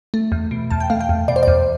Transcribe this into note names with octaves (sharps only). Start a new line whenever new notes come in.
A3
E2
B2
E2 A5
G5
A3 F5
G5
E2
B2 D5
C5
E2 D5